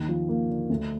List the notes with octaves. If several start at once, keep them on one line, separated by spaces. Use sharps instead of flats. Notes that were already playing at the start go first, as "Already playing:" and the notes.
Already playing: D#2 D#3
F3
A#3
D3
D2